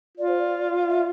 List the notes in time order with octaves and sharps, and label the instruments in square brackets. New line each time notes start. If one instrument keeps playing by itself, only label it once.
[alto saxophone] F4 [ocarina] D5
[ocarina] C5
D5
F5
E5